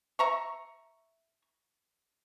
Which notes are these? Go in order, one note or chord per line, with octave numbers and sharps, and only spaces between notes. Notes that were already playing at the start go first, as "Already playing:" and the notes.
E5 A#5 C#6